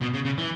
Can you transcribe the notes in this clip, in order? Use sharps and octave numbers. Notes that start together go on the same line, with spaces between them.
B2
C#3
C#3
E3